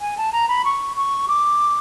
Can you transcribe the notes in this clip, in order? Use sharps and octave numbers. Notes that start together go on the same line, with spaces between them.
G#5
A5
A#5
B5
C#6
C#6
D6